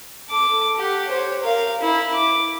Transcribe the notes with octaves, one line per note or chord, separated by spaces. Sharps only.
A4 D6
G4 F#5
C5 C#5
A#4 F5
E4
D6